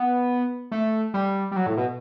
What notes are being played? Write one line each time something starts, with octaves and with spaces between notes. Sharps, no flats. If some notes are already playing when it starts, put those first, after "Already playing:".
Already playing: B3
A3
G3
G3
F#3
A2
B2